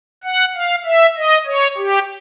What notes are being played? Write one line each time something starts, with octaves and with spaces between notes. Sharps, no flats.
F#5
F5
E5
D#5
C#5
G4